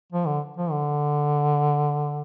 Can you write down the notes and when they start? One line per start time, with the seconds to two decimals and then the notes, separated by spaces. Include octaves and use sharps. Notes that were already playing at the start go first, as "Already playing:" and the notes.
0.12 F3
0.27 D3
0.57 F3
0.71 D3